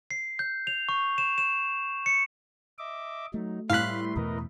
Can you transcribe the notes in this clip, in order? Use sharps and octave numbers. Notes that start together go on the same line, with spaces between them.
C7
G6
F7
C#6
E7
E7
C#7
D#5 E5 D6
F#3 A3 D#4
A2 G3 B4 F5 C6 F#6 B6
E2 B2 E3 A#4 B4 D#5